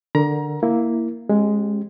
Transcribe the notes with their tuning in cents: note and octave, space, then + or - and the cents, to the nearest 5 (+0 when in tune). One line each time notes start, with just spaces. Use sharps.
D3 +10 A#4 +0 A#5 +25
A#3 +0 E4 +0
G#3 +0 C#4 -35 G4 -25